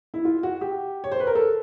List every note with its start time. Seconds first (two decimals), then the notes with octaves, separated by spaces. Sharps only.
0.14 E4
0.25 F4
0.43 F#4
0.61 G4
1.04 C#5
1.12 C5
1.20 B4
1.27 A#4
1.35 A4